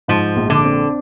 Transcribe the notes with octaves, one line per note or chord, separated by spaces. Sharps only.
G#2 F3
A#1
D3
C4